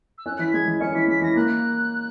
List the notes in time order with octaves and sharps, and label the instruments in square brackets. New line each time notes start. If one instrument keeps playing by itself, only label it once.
[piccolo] E6
[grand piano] C#4 [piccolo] F#6
[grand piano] E3 [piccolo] B6
[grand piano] G#3 [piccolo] G#6
[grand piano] E3
[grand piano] C#4 [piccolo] C#7
[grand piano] E3 [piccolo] B6
[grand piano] G#3 [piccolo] B6
[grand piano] E3 [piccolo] A#6
[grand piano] A#3 [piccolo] F#6